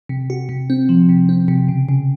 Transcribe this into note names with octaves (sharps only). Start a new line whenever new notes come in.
C3
F#4
C3
C4
F3
C3
C4
C3
C#3
C#3